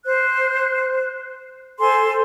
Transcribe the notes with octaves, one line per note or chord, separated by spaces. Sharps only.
C5 F#6
A4 C5 G#5 C6